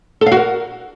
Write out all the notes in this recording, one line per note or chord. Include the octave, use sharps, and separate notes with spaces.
A4
F5
F#4
A#4